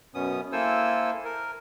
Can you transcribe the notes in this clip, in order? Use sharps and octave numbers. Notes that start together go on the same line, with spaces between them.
F#2 B2 B3 C#4 D#6
A#3 E4 A4 C5 G#5 E6
A#4